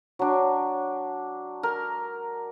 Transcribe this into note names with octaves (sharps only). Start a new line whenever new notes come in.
F#3 D4
A#4